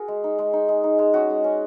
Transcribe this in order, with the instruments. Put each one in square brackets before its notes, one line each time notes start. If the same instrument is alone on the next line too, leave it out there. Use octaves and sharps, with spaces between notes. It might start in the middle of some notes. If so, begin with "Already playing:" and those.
Already playing: [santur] F#4 G#4 A#4
G#3
D#4
G#3
D#4
G#3
D#4
G#3
C#4 F#4
G#3
C#4